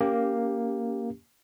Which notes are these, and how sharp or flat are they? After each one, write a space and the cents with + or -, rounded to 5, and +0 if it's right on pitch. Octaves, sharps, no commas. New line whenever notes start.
A#3 +0 C#4 +25 G4 +0